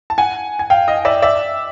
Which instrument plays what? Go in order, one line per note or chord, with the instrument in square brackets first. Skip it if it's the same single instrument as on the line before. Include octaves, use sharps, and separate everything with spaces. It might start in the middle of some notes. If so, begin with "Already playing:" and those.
[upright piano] A5
F#5 G#5
G#5
F5 G5
D#5 F5
D5 E5
D5 E5